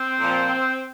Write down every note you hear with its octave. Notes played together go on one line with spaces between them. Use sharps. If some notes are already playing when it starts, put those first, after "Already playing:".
Already playing: C4
A#2 F3